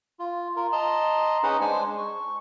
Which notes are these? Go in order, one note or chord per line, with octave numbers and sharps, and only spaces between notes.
F4
F4 A#4
D#5 A5 A#5 C6
C#4 D#4 G#4 B4 D#5 F#5
G#3 D4 C5 G#5
C#6